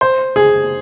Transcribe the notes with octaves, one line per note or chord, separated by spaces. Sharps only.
C5
G#4